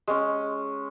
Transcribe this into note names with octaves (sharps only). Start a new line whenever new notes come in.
G#3 C#4